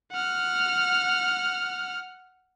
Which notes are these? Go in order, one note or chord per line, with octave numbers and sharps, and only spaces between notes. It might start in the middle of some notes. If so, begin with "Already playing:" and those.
F#5 F6